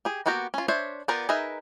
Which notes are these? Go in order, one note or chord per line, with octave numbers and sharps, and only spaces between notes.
G4 G#4
A#3 B3 F#4 G4 A#4
C#4 F4
D4 C5 C#5 E5
B3 F4 G4 A#4 D5
D#4 G#4 A#4 B4 E5